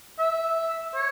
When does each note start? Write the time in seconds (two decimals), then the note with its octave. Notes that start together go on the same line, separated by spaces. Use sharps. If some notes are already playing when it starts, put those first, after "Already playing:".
0.18 E5
0.95 C#5